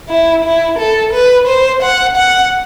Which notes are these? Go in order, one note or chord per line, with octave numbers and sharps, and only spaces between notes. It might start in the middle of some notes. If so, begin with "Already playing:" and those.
E4
E4
A4
B4
C5
F#5
F#5